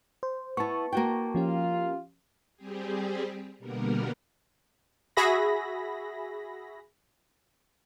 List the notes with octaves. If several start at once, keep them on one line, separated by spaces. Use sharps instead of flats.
C5
B3 E4 A5 C#6
A#3 F#4 G5
F3 C#4 F4 G4
G3 C4 G4 G#4
B2 D3 G3 A#3 B3 A#4
F#4 G#4 E5 B5 A#6